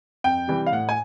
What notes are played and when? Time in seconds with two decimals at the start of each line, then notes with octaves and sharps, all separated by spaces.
0.24 F2 G5
0.48 C3 E3 G3
0.66 F5
0.72 A2 F#5
0.89 G#5